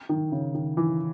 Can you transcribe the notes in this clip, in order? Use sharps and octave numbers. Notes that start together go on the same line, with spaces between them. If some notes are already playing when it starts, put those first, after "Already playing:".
D#3
C#3
D#3
E3